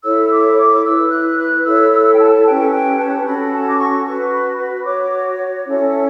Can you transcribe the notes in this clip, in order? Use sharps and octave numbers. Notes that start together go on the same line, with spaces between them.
E4 A4 C#5 E6
E6
D6
D6
E4 B4 E6
F#6
F#6
E4 A4 C#5 E6
E6
G5
A5
C#4 G4 B4 G5
G5
A5
C#4 F#4 A4 B5
A5
D6
C#6
F#4 B4 C#6
B5
B5
F#4 C#5 D6
C#4 E4 A4 C#5